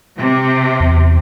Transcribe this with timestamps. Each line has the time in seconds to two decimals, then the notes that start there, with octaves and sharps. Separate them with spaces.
0.18 C3
0.80 E2